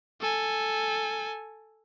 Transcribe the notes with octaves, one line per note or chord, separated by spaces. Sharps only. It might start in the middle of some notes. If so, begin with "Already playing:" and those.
A4 G#5